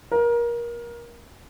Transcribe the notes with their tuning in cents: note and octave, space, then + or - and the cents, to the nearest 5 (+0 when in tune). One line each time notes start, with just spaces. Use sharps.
A#4 +25